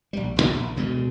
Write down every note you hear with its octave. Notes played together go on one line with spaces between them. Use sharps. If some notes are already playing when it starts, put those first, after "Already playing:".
A#1 G3
E1 A1 D#2
A#1
D2 B2 G#3